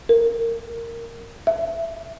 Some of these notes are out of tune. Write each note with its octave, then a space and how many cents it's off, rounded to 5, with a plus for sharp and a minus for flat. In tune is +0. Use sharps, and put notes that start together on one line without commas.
A#4 -10
E5 +10